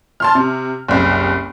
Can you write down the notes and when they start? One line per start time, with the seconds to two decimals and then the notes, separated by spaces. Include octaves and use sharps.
0.20 A5 C6 F6
0.35 C3
0.88 F#1 C2